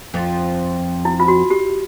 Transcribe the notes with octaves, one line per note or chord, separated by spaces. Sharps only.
F2 F3
E4
F4
F#4
G4